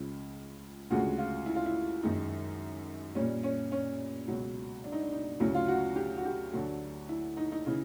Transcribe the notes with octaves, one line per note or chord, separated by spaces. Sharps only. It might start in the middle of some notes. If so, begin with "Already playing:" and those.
Already playing: C#2 C#3 F3
D2 C#3 F3 G#3 F#4
F4
E4
F4
E4
F#2 D#3 G#3 D#4
A#2 G3 C#4
C#4
C#4
C#2 B2 F#3
D4
D#4
D4
D#4
D2 C#3 F#3 E4
F4
F#4
G4
F#4
G4
D2 D3 F#3 A3
E4
D#4
D#4
C#3 E3